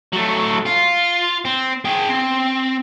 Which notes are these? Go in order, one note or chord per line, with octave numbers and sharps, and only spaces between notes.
F#3 A3
F4
C4
G#4 G5
C4